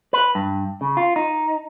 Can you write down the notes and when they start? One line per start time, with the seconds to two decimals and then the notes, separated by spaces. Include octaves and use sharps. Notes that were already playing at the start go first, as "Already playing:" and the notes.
0.13 B4
0.35 G2
0.81 C#3
0.97 F4
1.16 D#4